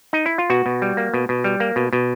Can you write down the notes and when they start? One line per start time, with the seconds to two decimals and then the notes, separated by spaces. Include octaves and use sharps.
0.13 D#4
0.26 E4
0.38 F4
0.50 B2 F#4
0.66 B2
0.82 G3
0.97 A#3
1.14 B2
1.29 B2
1.44 G3
1.60 A#3
1.76 B2
1.93 B2